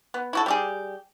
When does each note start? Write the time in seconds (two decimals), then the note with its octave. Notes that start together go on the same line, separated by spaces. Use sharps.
0.14 B3
0.33 E4 F#4 A4
0.46 G3 G4 G#4